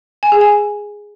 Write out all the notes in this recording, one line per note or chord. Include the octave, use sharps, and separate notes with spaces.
G#5
G#4
G#5